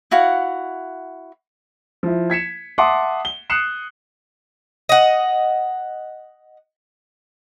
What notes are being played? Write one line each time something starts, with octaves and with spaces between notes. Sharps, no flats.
E4 F#4 F5 F#5
F3 E4
G#6 B6 C#7 E7
E5 F#5 A5 C6 D6 D#6
G7
D#6 F#6 C7 C#7 E7
D#5 F#5